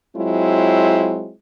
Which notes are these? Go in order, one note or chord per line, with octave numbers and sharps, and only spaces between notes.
F#3 G#3 C4 E4 F4